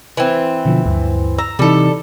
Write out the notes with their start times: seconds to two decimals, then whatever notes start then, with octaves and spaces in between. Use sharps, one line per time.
0.17 E3 C4
0.65 B2 D3 F3
0.85 D2 G2
1.38 A#5 E6
1.59 C3 E3 G3 D#4 A4